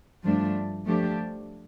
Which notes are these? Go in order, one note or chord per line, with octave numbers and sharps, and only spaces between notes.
G2 F3 A3 D4
F3 A3 D4 G4